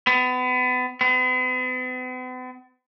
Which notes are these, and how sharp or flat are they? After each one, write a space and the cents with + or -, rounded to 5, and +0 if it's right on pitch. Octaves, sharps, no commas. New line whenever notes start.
B3 +30
B3 +45